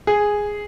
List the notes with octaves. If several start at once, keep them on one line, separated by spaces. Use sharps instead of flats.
G#4